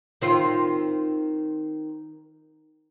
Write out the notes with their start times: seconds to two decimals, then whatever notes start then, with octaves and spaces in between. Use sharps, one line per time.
0.21 D#3 C4 F4